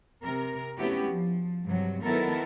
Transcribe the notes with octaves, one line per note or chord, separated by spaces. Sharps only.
C3 A#4
A3 B3 C#4 E4 F#4 G4
F3
G2 C3 F#3
D#3 F#3 B3 E4 A4 A#4